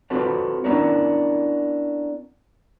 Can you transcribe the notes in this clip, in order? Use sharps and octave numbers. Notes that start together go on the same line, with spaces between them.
C4 F4 F#4 A4 B4 C#5
B3 C#4 D4 E4 A#4 C#5